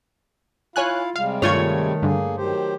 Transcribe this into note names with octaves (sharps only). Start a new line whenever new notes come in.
E4 F4 C#5 F5 G#5 F#6
C3 G3 G#3 F5
G2 D#3 A3 F4 C#5 G#6
G2 D3 A#3 G#4
D#3 F#3 G4 C5